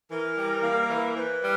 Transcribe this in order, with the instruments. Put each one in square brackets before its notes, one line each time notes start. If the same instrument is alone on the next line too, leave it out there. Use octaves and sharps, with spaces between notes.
[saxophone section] E3 [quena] A#4
[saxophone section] G3
A#3
E3
[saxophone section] E3 [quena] B4 C5
[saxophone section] G3